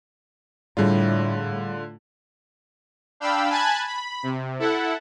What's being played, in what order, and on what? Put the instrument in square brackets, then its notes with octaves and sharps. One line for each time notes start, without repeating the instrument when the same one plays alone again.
[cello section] A2 [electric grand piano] D3 F4 [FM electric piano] G3 G#4 D5
[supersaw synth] D4 F5 G5 B5 E6
G#5 A5 B5 F#6 G#6 A6
B5
C3
E4 A4 F#5